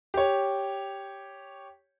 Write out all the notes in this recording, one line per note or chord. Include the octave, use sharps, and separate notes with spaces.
G4 C#5